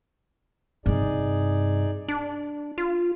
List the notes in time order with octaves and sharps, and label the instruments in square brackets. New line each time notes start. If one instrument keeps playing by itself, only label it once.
[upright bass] G2 C3 [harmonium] D#4 G#4 D5
[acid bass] D4
F4